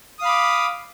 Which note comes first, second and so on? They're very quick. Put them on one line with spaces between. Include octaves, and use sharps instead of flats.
D#6 F5 B5 D6